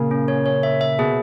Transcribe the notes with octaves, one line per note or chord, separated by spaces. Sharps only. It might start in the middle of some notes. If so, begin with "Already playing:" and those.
Already playing: A#2 C#3
C#4
C#5
C#5
E5
E5
B2 G#4